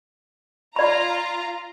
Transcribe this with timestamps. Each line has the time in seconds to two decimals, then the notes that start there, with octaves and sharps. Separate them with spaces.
0.76 F4 D5 A#5 B5